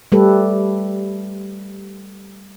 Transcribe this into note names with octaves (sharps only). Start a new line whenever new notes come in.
G3 A3 G4 A4 B4